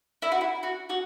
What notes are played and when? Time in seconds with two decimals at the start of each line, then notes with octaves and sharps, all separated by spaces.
0.22 E4
0.32 F#4
0.41 E4
0.63 F#4
0.90 F#4